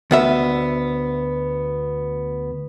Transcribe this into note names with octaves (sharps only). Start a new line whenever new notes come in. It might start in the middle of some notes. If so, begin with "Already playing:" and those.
D2 B3 E5